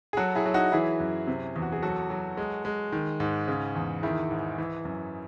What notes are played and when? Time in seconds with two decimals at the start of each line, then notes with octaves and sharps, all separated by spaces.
0.13 G#4
0.17 F#3 F#4 A4
0.35 E4 G#4
0.46 F#3
0.54 D#4 F#4
0.72 E3 E4 G#4
1.00 F#2
1.27 C3
1.56 E2
1.62 F#4
1.72 G#4
1.82 F#3 F#4 A4
2.10 F#3
2.37 G#3
2.65 G#3
2.92 D#3
3.20 G#2
3.48 C#3
3.75 E2
4.03 D#3 E4 G#4
4.31 G#2
4.58 E3
4.85 F#2